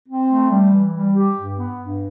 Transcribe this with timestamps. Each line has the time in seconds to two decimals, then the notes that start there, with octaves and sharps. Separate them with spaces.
0.08 C4
0.29 A3
0.50 G3
0.72 E3
0.94 G3
1.15 G4
1.37 G2
1.58 B3
1.79 G2